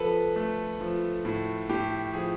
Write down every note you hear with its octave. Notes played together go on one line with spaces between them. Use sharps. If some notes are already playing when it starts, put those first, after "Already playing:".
Already playing: F3 A4 B4
A3
F3
A2
A2 G4
F3 G#4